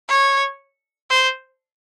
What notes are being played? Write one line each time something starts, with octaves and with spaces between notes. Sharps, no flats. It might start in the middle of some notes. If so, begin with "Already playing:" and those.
C#5
C5